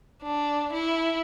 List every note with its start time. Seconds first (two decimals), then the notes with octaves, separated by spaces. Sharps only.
0.23 D4
0.73 E4